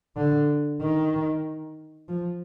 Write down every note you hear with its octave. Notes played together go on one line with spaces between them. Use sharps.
D3
D#3
F3